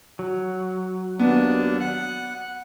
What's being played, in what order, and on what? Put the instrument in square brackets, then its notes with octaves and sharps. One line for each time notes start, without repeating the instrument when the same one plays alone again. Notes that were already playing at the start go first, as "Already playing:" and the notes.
[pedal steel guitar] F#3
[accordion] D#2 D4 [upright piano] B3
[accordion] F#5